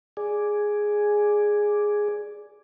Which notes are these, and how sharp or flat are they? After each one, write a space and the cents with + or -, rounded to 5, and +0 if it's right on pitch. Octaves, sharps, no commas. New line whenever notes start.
G#4 +0 D5 +0